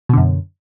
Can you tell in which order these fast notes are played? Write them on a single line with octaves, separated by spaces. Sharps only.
B2 D3 F#2